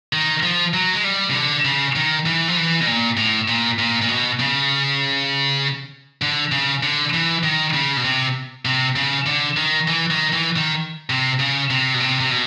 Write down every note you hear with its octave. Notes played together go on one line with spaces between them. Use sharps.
D#3
F3
F#3
G#3
G3
C#3
D3
C#3
D#3
E3
F3
E3
B2
A#2
A2
A#2
A#2
A#2
B2
C#3
D3
C#3
D3
E3
D#3
C#3
B2
C3
C3
C#3
D3
D#3
E3
D#3
E3
D#3
C3
C#3
C3
B2
C3
C3
B2